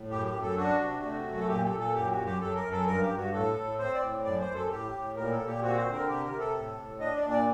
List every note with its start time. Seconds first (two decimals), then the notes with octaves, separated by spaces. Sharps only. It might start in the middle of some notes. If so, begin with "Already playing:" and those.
Already playing: A2
0.11 F#2 G4
0.26 G4
0.34 F#2
0.41 A4
0.57 D4 F#4
0.79 C3
1.03 A3
1.26 F#2
1.37 A4
1.48 A#2 G4
1.64 A4
1.71 A#2
1.80 A4
1.94 F#2 G4
2.10 F#4
2.17 F#2
2.25 G4
2.40 F#2 A4
2.55 A#4
2.63 F#2
2.71 A4
2.86 G2 A#4
3.02 G4
3.09 G2
3.17 F#4
3.32 A2 A4
3.56 A2
3.78 C4 C5
3.94 D5
4.01 A2
4.24 F#2 D5
4.40 C5
4.47 F#2
4.55 A4
4.70 A2 G4
4.93 A2
5.16 A#2 A#4
5.32 A4
5.39 A#2
5.46 G4
5.62 C4 F#4
5.77 C5
5.85 D3
5.93 A#4
6.08 C3 G4
6.24 A#4
6.31 C3
6.39 A4
6.54 A2
6.77 A2
7.00 D4 D#5
7.16 D5
7.22 A#2
7.30 D5